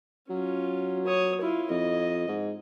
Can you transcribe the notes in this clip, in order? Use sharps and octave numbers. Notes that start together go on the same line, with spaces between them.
F#3 C#4 F4
C#5 D#6
E4 F4
F2 D#5
G#2